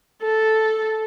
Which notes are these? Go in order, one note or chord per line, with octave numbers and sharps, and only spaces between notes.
A4